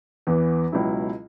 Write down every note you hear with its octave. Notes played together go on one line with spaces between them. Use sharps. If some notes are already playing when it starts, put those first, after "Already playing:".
E2 E3 B3
C#2 B2 F#3 C#4 E4